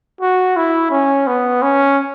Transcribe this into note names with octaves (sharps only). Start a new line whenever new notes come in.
F#4
E4
C#4
B3
C#4